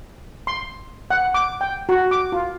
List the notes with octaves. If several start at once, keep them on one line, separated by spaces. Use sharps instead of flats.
C6
F#5
D6
G5
F#4
D6
F4